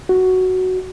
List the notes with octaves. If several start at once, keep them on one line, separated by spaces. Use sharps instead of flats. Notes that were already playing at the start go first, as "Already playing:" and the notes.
F#4